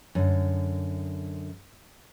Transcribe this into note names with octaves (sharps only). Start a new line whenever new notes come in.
F#2 D3